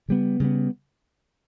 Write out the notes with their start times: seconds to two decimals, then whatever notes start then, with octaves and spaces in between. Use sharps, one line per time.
0.08 C#3 G3 B3
0.40 C#3 G3 B3